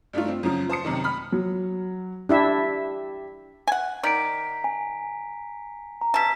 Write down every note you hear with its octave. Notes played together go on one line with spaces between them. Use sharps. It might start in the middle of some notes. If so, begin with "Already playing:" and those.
G2 A3 D4 D#4 F4
C4
F#2 C#3 F3
C5 A5 D#6 C#7
F#2 C3 D#3
B5 D#6 F6
F#3
D4 E4 G4 E5
F#5 G#5
D#3 D5 A#5 B6 D7
G#5
A#5
B2 A5 A#5 E6 B6